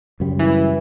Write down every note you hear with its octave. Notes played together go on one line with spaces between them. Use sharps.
F#2 C#3 G3
E3